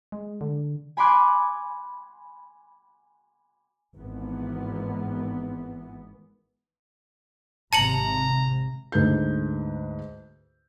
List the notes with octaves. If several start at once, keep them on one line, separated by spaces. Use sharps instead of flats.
G#3
D3
G#5 B5 C6 D6 F#6 G#6
G#1 E3 B3
G#1 C3 A5 A#5 C#7 F#7
D2 G#2 B4 G6